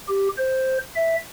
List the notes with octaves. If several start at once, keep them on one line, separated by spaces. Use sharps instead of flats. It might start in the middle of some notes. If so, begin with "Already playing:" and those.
G4
C5
E5